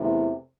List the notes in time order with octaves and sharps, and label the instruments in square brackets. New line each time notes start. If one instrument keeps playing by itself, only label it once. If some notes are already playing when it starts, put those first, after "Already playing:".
Already playing: [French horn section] E2 C3 E3 A3